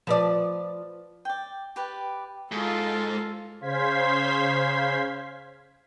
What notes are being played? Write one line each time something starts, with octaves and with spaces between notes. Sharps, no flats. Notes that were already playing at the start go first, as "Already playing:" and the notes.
F3 B4 D5
D5 G5
G4 B4 D5
G#2 F4 A4
C#3 C5 F5 C6 G#6 B6